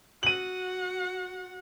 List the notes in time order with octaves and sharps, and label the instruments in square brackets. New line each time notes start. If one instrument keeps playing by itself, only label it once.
[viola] F#4 F#5 [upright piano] D#7 F#7